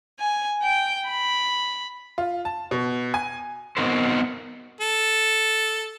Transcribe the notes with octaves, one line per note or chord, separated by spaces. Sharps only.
G#5
G5
B5
F4
A5
B2
G#5
B3 C4 D#4 F#4 A#4 C5
A4